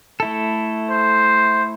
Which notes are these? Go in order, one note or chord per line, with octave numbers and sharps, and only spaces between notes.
A3 E4 A4
C5